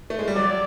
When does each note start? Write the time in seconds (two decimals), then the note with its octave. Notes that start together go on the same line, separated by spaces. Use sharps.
0.10 A3
0.19 G#3
0.28 G3
0.36 F#3 D5